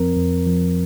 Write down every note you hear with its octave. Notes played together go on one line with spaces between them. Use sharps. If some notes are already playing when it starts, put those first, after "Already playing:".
Already playing: F2 F3 C4 A#4
F2
F3